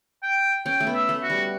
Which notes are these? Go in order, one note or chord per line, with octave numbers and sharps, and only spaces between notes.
G5
C#4 G5
A3
B3
E5
A3
F#4
G3